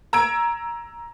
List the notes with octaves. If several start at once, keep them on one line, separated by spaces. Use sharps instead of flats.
A#5 E6 G#6 D7